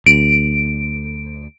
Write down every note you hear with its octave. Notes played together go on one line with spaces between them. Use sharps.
D2 D7